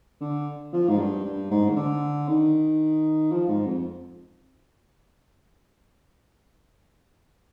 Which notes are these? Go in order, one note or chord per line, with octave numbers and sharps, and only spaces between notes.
D3
F3
G#2
G2
G2
G#2
D#3
D3
D#3
F3
G#2
F2